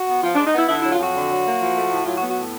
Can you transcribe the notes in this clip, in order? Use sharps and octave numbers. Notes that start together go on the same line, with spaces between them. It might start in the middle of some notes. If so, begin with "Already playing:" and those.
Already playing: F#4
B3
F3 F4
G#3 D4
D#4
B3 E4
D3 E4
F#3 E4
F4
F2 F#4
D3
F#3
A#3
F3
A3
A2
F#3 F4
F#4
B3
F#4
A2